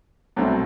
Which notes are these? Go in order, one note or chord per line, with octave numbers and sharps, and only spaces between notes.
C2 B2 F#3 A3 C4